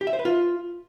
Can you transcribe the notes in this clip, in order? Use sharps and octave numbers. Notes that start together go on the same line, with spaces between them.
G4
E5
C5
B4
F4